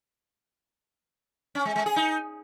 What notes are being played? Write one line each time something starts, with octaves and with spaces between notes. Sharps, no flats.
C#4
G#3
G#3
G#4
D#4